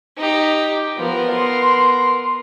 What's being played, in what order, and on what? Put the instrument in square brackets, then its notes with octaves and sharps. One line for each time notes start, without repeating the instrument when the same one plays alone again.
[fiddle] D#4 G4
[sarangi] F3 [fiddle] B3 A#4
[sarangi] C6